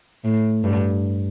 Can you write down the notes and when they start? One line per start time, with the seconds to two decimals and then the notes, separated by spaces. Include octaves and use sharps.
0.24 A2
0.64 G2